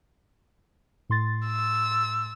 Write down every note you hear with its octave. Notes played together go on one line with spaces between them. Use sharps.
A2 C6 A6
E6